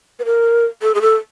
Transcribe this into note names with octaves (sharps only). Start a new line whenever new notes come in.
B4
A#4
A4
G#4
A4